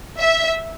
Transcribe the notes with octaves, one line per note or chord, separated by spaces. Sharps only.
E5